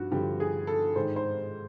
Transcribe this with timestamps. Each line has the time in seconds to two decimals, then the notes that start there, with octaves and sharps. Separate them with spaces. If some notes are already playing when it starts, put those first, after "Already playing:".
Already playing: G2 F3 F#4
0.11 G2 D3 F3 G4
0.40 G#4
0.67 A4
0.96 G#2 D#3 C5
1.16 C5